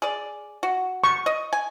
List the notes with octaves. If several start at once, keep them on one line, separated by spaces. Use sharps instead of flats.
G#4 D5
F#4
C#6
D#5
G#5